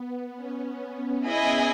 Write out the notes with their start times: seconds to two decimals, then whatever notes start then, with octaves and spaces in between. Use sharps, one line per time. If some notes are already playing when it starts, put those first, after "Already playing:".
Already playing: B3
0.36 C#4
1.26 E4 G#4 D#5 G#5